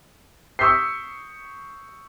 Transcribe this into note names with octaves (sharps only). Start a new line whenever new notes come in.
C#6 D#6 E6 G6 B6 C7